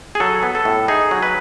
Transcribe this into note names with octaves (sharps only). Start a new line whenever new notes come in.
G#4
F#3 A4
B3
A4
A2
D#4 G#4
F#3
B4